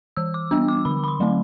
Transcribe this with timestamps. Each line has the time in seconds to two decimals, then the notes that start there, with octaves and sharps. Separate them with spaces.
0.17 E3 E6
0.34 D6
0.51 G3 B3 D4 E6
0.68 D6
0.85 D3 B5
1.04 B5
1.08 C6
1.20 F#3 A3 C4